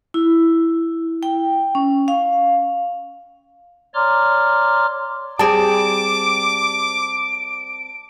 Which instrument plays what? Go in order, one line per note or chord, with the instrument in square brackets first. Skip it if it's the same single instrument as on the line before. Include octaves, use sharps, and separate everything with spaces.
[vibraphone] E4
G5
C#4
F5
[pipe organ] C#5 D5 A#5 C6 D6 F6
[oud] G3 C4 G#4 [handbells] A5 [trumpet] D6 [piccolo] D7